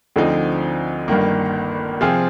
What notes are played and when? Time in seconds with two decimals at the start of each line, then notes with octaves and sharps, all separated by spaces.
0.16 D2 D3 F3 C4 D#4
1.08 G1 G2 D#3 A#3
2.01 C3 F3 C4 F4 G#4